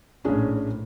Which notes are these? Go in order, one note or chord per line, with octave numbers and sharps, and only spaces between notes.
A#1 A2 C#4 D4 G#4